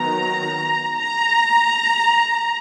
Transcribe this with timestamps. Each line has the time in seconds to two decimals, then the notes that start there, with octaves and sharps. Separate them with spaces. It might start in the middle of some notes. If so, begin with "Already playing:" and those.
Already playing: D#3 F#3 B3 A#5
0.96 A#5